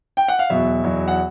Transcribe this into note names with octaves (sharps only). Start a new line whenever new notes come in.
G5
F#5
F5
E2 B2 F#3 E5
E2 B2 F#3
F#5